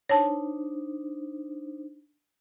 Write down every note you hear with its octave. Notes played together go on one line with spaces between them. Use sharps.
D4 D#4 C5 C#5 A5